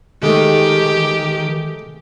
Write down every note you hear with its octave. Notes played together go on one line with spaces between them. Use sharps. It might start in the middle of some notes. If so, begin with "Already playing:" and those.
D#3 G#3 A3 G4